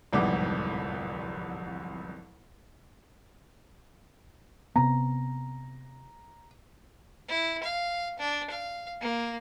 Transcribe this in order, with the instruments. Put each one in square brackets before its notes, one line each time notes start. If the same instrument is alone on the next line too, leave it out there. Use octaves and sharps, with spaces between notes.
[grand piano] D1 C2 F2 G#2 B3 D6
[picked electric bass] C3 B3 [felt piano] A#5
[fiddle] E4
F5
D4
F5
A#3